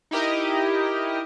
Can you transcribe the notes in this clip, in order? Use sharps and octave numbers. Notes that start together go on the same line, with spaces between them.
D#4 E4 G4 A#4 D#5